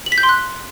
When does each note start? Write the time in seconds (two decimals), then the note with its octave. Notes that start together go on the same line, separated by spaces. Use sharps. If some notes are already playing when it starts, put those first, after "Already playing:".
0.06 F#7
0.12 B6
0.18 G6
0.23 C6
0.29 F#6